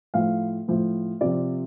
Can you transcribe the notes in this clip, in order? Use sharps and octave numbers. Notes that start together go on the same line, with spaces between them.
A2 F3 F5
A2 F3
C3 F3 D5